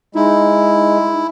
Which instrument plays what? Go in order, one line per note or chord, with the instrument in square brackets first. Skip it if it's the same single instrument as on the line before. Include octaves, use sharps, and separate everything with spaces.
[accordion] G#3 [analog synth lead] D#4 [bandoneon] E4